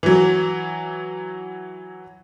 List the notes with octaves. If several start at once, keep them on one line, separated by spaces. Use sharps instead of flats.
E3 F#3